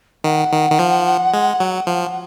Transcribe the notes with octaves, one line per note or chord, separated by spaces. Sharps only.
D#3 F#5
D#3
D#3
F3
G#3
F#3
F3